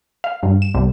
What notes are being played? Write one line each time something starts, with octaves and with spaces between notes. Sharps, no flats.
F5
G2
E7
C2